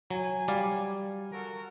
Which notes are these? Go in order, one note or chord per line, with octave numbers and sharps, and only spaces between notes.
F#3 G#5
G3 D5 F5
F#4 A4 A#4